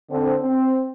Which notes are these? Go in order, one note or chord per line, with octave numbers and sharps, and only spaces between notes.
D3 C4
C4